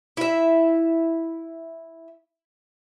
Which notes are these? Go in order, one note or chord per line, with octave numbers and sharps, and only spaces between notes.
E4 E5